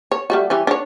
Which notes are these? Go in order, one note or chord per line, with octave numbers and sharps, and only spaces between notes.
C#5
G3 A3 F#4
E3 G3 C#4
D4 C#5